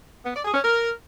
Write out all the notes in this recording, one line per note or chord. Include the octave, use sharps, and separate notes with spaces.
B3
D5
G#4
C#4
A#4